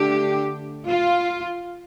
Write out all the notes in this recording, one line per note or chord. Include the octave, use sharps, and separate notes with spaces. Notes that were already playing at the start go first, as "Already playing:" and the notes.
Already playing: D3 A3 D4 G4
F4